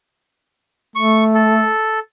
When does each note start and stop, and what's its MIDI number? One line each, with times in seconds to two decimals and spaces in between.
0.96 1.70 57
0.96 1.24 85
1.35 2.00 69